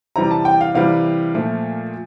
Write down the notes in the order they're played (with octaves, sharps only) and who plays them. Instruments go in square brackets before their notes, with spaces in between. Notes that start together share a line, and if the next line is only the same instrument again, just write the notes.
[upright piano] C3 E3 G3 A#5
A5
G5
F5
C3 E3 G3 F5
A#2 F3 A3